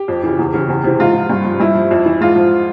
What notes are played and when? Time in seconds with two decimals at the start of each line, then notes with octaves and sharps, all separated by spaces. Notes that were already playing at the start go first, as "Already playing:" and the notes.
Already playing: G4
0.08 F2
0.23 C#3 E3
0.39 E2
0.54 C#3 E3
0.68 E2
0.84 C3 E3
0.99 G#2 F4
1.14 F3
1.30 G2
1.45 F3
1.60 G2 E4
1.75 F3
1.91 F2
2.06 E3
2.21 G#2 F4
2.36 F3